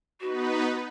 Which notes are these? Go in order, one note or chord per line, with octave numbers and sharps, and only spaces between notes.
B3 D#4 F#4 B4